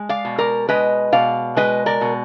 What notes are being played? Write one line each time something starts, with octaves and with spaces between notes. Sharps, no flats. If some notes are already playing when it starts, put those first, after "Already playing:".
Already playing: G#3
D5 F5
B2
A#4 D5
G#3 B4 D#5
B2 D5 F5
G#3 B4 D#5
A#4 D5
B2